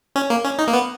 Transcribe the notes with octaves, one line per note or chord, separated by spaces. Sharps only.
C#4
A#3
C#4
D#4
A#3
B3